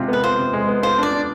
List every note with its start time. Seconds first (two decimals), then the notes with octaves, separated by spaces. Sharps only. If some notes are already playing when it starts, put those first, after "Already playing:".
Already playing: C3 G#3 F4
0.08 B3 B4
0.23 F4 C5
0.39 C3
0.53 G#3
0.69 B3
0.83 F4 C5
0.98 D4 D5
1.13 D4